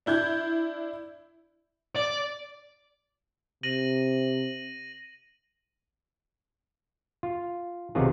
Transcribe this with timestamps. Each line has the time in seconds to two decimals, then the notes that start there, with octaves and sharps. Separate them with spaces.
0.06 D4 E4 G6 G#6
1.96 D5
3.63 C3 A#6 D#7 F#7
7.23 F4
7.95 B1 C3 D#3 F#3 F4 G#4